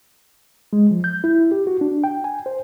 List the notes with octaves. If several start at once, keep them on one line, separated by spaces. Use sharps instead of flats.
G#3
F3
G6
E4
G4
F#4
D4
G5
G#5
C5